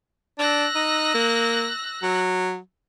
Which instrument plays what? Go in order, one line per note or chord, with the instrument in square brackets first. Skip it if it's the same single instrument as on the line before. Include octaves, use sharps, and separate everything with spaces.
[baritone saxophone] D4 [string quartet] E6 F#6 A#6
[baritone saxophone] D#4
A#3
F#3